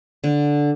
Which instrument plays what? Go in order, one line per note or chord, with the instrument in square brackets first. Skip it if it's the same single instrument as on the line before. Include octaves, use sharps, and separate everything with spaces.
[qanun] D3